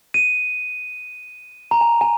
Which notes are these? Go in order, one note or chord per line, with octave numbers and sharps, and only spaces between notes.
D#7
A#5
G#5
G#5